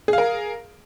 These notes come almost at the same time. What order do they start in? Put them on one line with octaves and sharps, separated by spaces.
G#4 F5 A#4